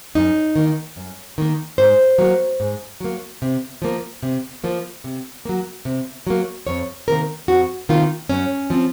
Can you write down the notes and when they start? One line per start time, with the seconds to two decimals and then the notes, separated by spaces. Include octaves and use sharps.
0.15 F#2 D#4
0.56 D#3 A#3
0.96 F#2
1.38 D#3 A#3
1.78 G#2 C5
2.18 F#3 A#3
2.60 G#2
3.00 F#3 A#3
3.42 C3
3.82 F3 A#3
4.23 C3
4.64 F3 A#3
5.04 C3
5.45 F#3 A#3
5.85 C3
6.27 F#3 A#3
6.67 F2 C#5
7.08 C3 D#3 A#3 A#4
7.48 F2 F#4
7.89 C3 D#3 A#3 F4
8.29 F#2 C#4
8.70 F3 C4